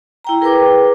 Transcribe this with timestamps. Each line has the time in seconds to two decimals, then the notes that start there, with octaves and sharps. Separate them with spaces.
0.24 E4 G5 A#5
0.41 G#4 A#4 B4 G5 D6